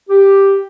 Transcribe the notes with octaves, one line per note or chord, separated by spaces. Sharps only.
G4